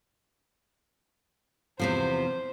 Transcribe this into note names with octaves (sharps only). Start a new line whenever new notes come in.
E2 C3 F3 C5